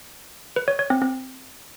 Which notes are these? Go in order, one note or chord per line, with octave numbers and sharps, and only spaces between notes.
B4
C#5
C#5
C4
C4